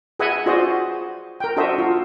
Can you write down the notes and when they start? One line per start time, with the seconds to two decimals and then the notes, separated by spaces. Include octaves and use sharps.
0.19 G#4 B4 D#5 E5 F#5 G#5
0.46 F4 F#4 G#4 C5 D5 D#5
1.40 A#4 G5
1.57 D4 F#4 A4 C5 D#5 E5
1.78 F4